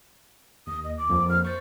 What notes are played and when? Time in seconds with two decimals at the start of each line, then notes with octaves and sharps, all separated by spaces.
0.67 D#2 D#6
0.84 D#5
0.97 D6
1.10 F2 F3 A#3
1.29 F6
1.45 C5 C#6 A6